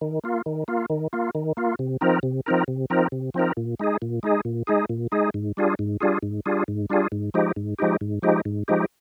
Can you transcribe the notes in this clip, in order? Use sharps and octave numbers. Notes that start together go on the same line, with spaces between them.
D#3
A#3 F4
D#3
A#3 F4
D#3
A#3 F4
D#3
A#3 F4
C3
F3 C4 D#4 A#4
C3
F3 C4 D#4 A#4
C3
F3 C4 D#4 A#4
C3
F3 C4 D#4 A#4
A#2
G#3 D#4 G#4
A#2
G#3 D#4 G#4
A#2
G#3 D#4 G#4
A#2
G#3 D#4 G#4
G#2
G3 D4 F4 G#4
G#2
G3 D4 F4 G#4
G#2
G3 D4 F4 G#4
G#2
G3 D4 F4 G#4
G#2
F3 G#3 D#4 G4
G#2
F3 G#3 D#4 G4
G#2
F3 G#3 D#4 G4
G#2
F3 G#3 D#4 G4